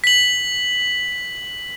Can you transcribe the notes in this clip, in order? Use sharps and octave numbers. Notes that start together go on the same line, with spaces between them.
B6 F#7